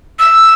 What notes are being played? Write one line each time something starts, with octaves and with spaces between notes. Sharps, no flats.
E6